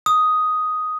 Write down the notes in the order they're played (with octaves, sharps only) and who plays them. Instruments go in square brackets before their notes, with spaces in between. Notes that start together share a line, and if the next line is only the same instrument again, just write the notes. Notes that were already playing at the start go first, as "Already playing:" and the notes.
[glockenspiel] D#6